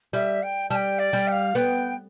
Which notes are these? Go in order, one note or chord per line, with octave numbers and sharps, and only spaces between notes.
G3 E5
G5
G3 G5 A5
D5
G3
G5
F5
B3 G5